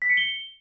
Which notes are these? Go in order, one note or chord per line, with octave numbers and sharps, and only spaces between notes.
B6
C#7
G7